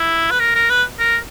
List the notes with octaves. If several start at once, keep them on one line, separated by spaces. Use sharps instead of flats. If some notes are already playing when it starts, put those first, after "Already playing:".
Already playing: E4
B4
A#4
A#4
B4
A#4